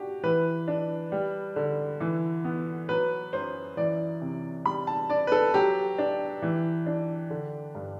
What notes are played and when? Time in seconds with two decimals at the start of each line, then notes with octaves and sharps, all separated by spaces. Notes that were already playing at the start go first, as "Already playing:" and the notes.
Already playing: D4 F#4 G4
0.23 E3 B4
0.68 D4
1.12 G3
1.56 D3
2.00 E3
2.44 B3
2.89 F#3 B4
3.33 F#2 C5
3.77 E3 D5
4.22 C3
4.65 G3 B5
4.87 A5
5.10 D4 D5
5.27 B4
5.32 A4
5.54 F#3 G4
5.98 D4
6.42 E3
6.86 D4
7.30 D3
7.75 G2